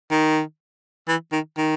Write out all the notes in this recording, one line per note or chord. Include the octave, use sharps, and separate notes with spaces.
D#3
E3
D#3
D#3